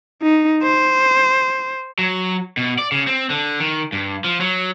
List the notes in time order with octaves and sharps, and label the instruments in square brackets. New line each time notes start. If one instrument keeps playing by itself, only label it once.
[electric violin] D#4
C5
[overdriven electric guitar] F#3
B2
D5
C#3
C4
D3
D#3
G2
F3
F#3